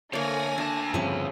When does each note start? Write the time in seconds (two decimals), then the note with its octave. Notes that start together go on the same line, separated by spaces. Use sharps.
0.13 D3 A3 A#3 C#5 D5 G#5 A#6
0.58 D2 D4 A5
0.94 G2 C#3 F3 C4 B4 C#6